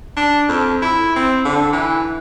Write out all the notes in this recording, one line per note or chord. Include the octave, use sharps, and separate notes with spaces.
D4
F2
E4
C4
D3
E3